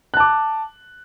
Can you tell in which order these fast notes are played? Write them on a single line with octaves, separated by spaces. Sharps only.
F#6 A5 D6